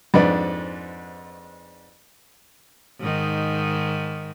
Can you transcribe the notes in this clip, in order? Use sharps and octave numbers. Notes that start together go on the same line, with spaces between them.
F2 G#2 D4 B4 D5
G#2 D#3